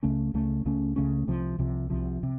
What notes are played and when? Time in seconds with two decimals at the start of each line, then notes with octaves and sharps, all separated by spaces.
0.03 C#2 C#3 A3 C#4
0.34 C#2 C#3 A3 C#4
0.65 C#2 C#3 A3 C#4
0.96 C#2 C#3 A3 C#4
1.28 C2 C3 F3
1.59 C2 C3 F3
1.90 C2 C3 F3
2.23 C3